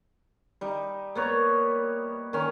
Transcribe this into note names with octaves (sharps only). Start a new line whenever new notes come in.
G3 D#4
A#3 B3 C#5
D#3 C#4